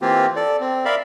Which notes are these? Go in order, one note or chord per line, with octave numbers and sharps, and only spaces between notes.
E3 A#3 C4 F4 G4
A4 D5
C4
A#4 D5 E5 F5 B5